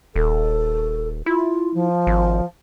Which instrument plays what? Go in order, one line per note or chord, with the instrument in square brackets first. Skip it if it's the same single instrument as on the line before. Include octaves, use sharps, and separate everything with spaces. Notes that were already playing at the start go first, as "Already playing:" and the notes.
[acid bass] D#1 [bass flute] A4
[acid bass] E4 [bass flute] F4
[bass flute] F3
[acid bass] G#1